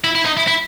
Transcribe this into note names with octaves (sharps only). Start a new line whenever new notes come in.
E4
E4
D#4
E4
E4